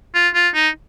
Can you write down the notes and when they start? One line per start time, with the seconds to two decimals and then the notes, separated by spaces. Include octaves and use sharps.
0.14 F4
0.34 F4
0.55 D#4